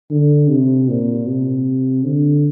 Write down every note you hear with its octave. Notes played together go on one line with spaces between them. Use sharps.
D3
C3
A#2
C3
D3